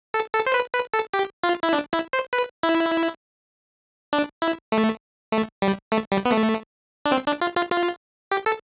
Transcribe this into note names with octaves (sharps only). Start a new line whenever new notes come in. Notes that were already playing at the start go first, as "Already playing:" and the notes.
A4
A4
C5
B4
B4
A4
G4
F4
E4
D4
E4
C5
B4
E4
D4
E4
A3
A3
G3
A3
G3
B3
A3
D4
C4
D4
F4
F4
F4
G4
A4